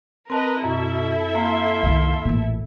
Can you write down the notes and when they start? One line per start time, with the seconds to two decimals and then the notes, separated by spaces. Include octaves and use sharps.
0.30 C4 A#4 B4 D#5 A5
0.64 F#2 B2 E4 A4 E5
1.35 A#3 F5 C6
1.83 C2 D#3
2.25 A1 A#2